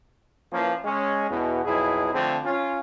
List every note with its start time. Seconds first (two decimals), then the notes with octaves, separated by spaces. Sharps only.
0.53 E3 F3 A#3 C#4
0.85 G#3 C#4
1.31 E2 B2
1.65 B1 F2 E4 G#4
2.14 D3 F3 A3 C4
2.45 C#4 F4